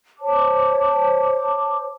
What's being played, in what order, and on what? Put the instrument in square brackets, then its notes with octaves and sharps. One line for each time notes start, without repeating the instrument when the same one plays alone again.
[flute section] C5 C#5 A5 D6